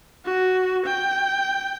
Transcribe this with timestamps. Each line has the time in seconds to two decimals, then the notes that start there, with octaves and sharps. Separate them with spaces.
0.25 F#4
0.86 G5